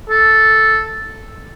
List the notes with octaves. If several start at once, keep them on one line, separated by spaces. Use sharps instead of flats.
A4